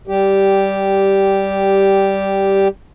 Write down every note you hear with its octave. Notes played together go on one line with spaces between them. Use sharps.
G3 G4